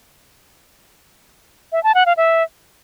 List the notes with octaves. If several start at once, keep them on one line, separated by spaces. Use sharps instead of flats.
E5
A5
F#5
F5
E5